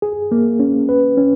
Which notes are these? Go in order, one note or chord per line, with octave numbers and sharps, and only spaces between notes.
G#4
A#3
C#4
B4
C#4